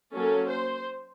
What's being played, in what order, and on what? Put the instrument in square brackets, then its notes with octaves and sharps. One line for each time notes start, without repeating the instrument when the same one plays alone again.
[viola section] F#3 A#3 C#4 A4
C5